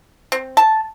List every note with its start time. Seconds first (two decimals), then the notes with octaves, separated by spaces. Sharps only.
0.32 C4
0.57 A5